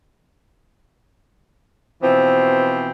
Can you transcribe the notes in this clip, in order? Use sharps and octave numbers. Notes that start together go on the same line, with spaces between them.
B2 E3 F3 C4